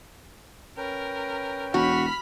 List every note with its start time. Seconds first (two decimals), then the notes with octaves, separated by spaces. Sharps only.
0.77 C#4 A#4 B4 G5
1.74 E1 F#4 B5 F6